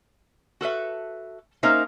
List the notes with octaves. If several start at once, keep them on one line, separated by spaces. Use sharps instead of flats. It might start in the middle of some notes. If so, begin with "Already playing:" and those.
F#4 A4 B4 E5
A#3 C#4 D#4 A#4 C5 E5